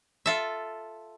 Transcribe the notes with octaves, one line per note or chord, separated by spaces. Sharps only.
F4 A4 E5